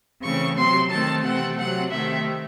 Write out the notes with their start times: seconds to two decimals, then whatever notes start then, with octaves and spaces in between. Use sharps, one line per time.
0.22 C#3 E3 A3 C4 C#6
0.56 C3 F#3 C4 C6
0.90 D#3 A3 C4 A5
1.23 C3 E3 A3 C4 F#5
1.57 C3 F#3 C4 F#5
1.91 C3 D#3 A3 C4 E5